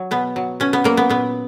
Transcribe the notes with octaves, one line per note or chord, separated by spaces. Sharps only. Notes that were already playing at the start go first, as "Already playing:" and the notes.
Already playing: F#3
B2 B3
F#3
B2 C#4
B3
F#3 A#3
B3
A#2 B3